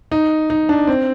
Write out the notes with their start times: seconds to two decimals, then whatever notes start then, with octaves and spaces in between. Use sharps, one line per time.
0.11 D#4
0.50 D#4
0.69 D4
0.87 C4